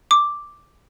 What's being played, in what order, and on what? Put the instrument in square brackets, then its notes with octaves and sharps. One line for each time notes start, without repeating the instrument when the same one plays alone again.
[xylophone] D6